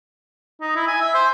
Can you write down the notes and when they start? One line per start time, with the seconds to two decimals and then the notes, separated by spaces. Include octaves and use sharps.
0.61 D#4
0.76 E4
0.88 G#5
1.01 E5
1.15 C5